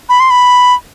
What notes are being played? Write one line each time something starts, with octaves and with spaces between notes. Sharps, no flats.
B5
C6
B5